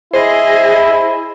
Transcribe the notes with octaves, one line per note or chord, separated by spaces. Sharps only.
E4 G#4 C5 D#5